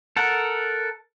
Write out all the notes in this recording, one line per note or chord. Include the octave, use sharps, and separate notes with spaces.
A4 A#4 F#5